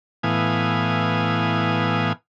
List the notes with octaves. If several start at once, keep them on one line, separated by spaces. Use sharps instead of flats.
A2 E3 B3 F5 G#5 D#6